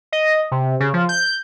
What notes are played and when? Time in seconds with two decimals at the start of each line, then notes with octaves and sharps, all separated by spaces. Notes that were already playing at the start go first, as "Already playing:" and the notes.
0.12 D#5
0.52 C3
0.80 C#3
0.94 F3
1.09 G6